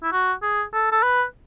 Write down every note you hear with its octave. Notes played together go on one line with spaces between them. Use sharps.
E4
F#4
G#4
A4
A4
B4